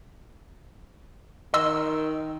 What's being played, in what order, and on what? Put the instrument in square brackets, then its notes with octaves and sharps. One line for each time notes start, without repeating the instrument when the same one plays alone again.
[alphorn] D#3 [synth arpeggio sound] D#5 C6 E6